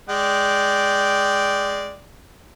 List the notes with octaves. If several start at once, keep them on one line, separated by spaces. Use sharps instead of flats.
G#3 D5 G5